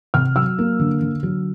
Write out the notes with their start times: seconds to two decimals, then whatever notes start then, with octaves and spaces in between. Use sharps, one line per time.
0.14 C3 F6
0.36 F#3 E6
0.58 A#3
0.79 D3
1.02 D3
1.23 F#3